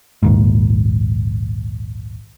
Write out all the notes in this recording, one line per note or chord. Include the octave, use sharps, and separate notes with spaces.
A#1 D#2 G#2